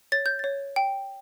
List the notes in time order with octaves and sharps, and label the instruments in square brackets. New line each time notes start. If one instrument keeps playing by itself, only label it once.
[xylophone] C#5 A6
G6
C#5 A6
G5